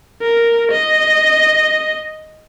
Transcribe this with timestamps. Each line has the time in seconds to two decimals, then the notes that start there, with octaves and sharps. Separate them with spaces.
0.22 A#4
0.72 D#5